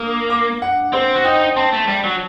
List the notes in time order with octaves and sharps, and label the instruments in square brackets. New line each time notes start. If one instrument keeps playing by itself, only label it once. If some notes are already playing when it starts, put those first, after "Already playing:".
Already playing: [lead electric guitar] A#3 [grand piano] D#6
[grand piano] D6
F#5
[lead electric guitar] C4 [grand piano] C5
[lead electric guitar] F#4
[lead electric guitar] D#4 [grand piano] G5
[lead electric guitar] C4 [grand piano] A5
[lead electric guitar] A3
G3
F#3